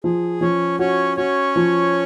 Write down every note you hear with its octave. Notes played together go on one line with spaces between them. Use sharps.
F3 G#4
F3 C#4 C#5
C#4 F#4 C#5
C#4 F#4 C#5
F3